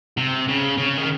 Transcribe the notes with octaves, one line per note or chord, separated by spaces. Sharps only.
C3
C#3
C#3
D#3